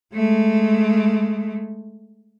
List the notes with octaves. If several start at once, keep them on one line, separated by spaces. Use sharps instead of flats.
G#3 A3